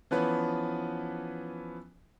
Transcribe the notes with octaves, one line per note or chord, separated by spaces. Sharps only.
E3 F3 B3 C#4 B4